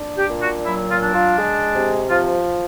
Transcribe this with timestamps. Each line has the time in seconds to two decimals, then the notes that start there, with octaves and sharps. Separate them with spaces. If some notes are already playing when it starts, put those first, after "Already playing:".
Already playing: D4
0.17 G4
0.31 A#2
0.42 F#4
0.66 F#3 E4
0.90 F4
1.03 D4
1.15 F4
1.39 G#3
1.74 C3
2.10 F3 F4